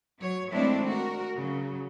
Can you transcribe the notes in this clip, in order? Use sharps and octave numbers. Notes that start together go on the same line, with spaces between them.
F#3 C#5
D#3 G#3 A3 C4 D4 E4
F#4 A#4
C#3 F#3